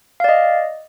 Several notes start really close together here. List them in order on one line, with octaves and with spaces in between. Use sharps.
F5 D5 D#5